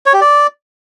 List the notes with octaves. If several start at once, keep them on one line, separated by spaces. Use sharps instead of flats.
C#5
G4
D5